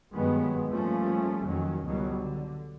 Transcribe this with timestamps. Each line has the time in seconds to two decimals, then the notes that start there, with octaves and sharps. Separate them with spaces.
0.13 G2 D#3 F#3 G#3 B3
0.69 F3 G3 A3 A#3 C#4
1.45 F2 D#3 F#3 C#4
1.85 C#2 B2 D#3 F#3 G3
2.17 D3